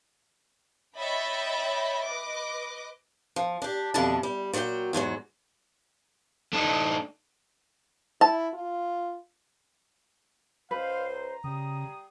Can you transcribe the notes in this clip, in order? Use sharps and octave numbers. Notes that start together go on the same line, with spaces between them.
C#5 D#5 E5 G5 B5 A6
B4 D#5 D6
F3
D4 G4
F2 B2 D3 E3 D4 A5
G3
A#2 F#3 F#4 G4 G5
E2 G#2 F#3 F#4
A3 D4 D#4
E4 A5
F4
C#2 B4 C5 F5
A#5
C#3 G3 G5 D#6